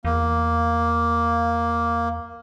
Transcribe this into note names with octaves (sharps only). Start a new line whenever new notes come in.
E2 A#3